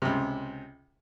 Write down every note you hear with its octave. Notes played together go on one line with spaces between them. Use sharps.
C#2 C3